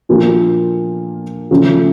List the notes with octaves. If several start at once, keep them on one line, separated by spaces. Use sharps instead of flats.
A#2 F3 A#3 D4 F4
C#3 F3 A3 C#4